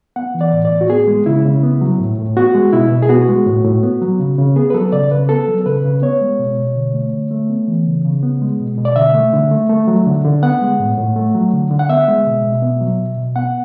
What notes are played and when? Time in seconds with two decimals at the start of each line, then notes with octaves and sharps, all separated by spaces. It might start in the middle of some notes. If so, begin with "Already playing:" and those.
0.16 B3 F#5
0.34 E3
0.41 D5
0.53 A2
0.65 D5
0.71 A2
0.81 F#4
0.90 B3 G#4
1.07 G#3
1.26 C#3 E4
1.45 C#3
1.63 B3
1.81 F#3
2.00 A2
2.18 A2
2.37 B3 F#4
2.55 G#3
2.73 B2 E4
2.92 B2
3.03 G#4
3.09 B3 F#4
3.28 G#3
3.46 A2
3.65 A2
3.83 B3
4.02 F#3
4.20 C#3
4.38 C#3
4.56 B3 G#4
4.70 B4
4.74 F#3 A4
4.92 C#3 D5
5.11 C#3 B4
5.29 B3 A4
5.48 F#3
5.61 A4
5.66 C#3 B4
5.84 C#3
6.02 B3 C#5
6.21 G#3
6.39 B2
6.58 B2
6.76 D3
6.94 A3
7.13 D3
7.31 A3
7.50 B3
7.68 E3
7.86 C#3
8.05 C#3
8.23 B3
8.42 G#3
8.60 B2
8.78 B2
8.85 D5
8.96 D3 E5
9.15 A3
9.33 D3
9.51 A3
9.69 A3
9.88 F#3
10.06 D3
10.24 D3
10.43 B3 F#5
10.61 G#3
10.80 A2
10.98 A2
11.16 A3
11.35 F#3
11.53 D3
11.71 D3
11.79 F#5
11.89 B3 E5
12.08 G#3
12.26 B2
12.44 B2
12.62 B3
12.81 F#3
12.99 B2
13.17 B2
13.36 B3 F#5